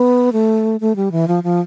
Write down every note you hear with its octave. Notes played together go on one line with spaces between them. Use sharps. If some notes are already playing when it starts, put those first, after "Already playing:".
Already playing: B3
A3
A3
G3
E3
F3
F3